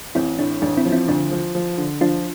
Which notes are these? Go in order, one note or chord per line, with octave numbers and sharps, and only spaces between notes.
A1 C4 E4
A2 D4
A1 D4
C4 E4
F3
C4 E4
D2 D4
F3
F3
D3
F3 D4 F4